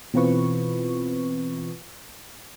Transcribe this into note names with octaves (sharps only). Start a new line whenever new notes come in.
B2 E3 C4 F4 B4 C#6